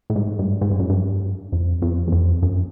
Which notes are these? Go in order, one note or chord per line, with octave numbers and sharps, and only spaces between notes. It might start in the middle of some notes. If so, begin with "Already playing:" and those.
A2
G#2
G2
G#2
G2
F#2
G2
F2
F2
E2
F2
F#2